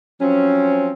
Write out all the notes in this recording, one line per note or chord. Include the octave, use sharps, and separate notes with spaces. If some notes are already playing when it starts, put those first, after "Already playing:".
F3 F#3 C4 C#4